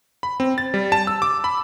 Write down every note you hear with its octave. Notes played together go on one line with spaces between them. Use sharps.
B5
C4
A6
G3
A5
E6
D6
B5